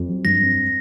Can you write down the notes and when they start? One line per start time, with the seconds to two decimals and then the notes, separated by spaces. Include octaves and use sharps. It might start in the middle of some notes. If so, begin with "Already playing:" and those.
Already playing: F2
0.09 F#3
0.25 G2 A#6
0.42 C4